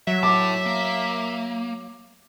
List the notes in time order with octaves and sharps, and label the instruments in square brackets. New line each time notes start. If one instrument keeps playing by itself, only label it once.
[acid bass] F#3 [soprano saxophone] E5
[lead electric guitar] A2 A5 [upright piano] D6
[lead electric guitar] A#3